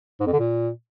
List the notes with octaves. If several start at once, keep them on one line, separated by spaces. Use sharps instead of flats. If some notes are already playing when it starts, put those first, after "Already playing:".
G#2
F2
D3
A#2